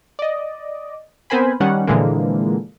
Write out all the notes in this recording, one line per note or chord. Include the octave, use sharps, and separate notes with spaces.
D5 D#5
B3 C4 A#4 C5 G#5 B5
D#3 G3 C#4 F#5
A#2 D3 E3 F3 G#3 A#3